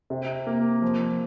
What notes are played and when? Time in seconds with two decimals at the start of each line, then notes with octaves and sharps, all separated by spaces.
0.10 C3
0.47 A#3
0.82 F3